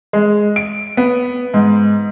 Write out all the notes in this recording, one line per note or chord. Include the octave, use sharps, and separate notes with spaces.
G#3
D7
B3
G#2